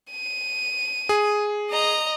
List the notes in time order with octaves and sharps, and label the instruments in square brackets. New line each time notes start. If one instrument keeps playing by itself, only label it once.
[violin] D#7
[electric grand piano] G#4
[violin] D#5 A#5